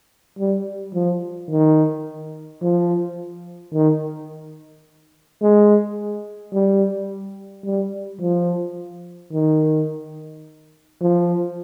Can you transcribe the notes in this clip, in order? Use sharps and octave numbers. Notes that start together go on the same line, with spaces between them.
G3
F3
D#3
F3
D#3
G#3
G3
G3
F3
D#3
F3